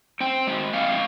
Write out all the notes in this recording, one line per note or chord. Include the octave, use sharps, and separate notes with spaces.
C4 G5
G#3
C4 F5